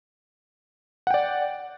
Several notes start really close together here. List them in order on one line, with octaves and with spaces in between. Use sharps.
F#5 G5 D5